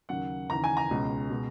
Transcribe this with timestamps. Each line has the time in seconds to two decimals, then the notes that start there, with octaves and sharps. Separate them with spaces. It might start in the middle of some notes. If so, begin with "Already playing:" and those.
0.09 D#2 C#3 F#3 A#3 C#4 F#5
0.50 D#2 C#3 E3 A#5
0.64 G#5
0.77 A#5
0.91 C#2 B2 G#3 C#4
1.31 B2 G#3